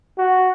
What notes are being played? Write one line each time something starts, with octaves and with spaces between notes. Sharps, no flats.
F#4